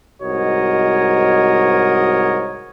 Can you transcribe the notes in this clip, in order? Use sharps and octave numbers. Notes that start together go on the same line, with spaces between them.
C2 G#2 F#4 A#4 C#5 D#5